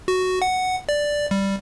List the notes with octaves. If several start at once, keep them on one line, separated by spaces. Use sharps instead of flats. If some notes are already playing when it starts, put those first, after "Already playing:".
F#4
F#5
D5
G3